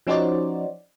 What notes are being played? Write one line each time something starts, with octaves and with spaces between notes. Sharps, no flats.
F3 C#4 D#4 F#4 C5 D5